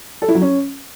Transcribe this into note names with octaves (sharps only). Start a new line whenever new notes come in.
A4
E4
F#3
C#4